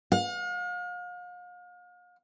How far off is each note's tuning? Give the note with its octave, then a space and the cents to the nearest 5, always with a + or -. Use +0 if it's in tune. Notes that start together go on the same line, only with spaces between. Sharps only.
F5 +40